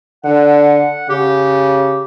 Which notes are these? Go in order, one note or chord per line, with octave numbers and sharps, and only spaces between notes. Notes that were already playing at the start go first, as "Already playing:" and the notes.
D3 F#5
C#3 G4